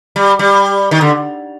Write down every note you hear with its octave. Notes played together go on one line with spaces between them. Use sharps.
G3
G3
D#3
D3